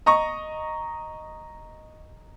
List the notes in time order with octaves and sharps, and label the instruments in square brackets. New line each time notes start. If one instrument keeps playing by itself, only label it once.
[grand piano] D#5 A#5 C#6